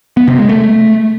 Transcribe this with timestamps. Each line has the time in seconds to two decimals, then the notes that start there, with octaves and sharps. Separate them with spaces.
0.17 B3
0.28 C3
0.38 G#3
0.49 A3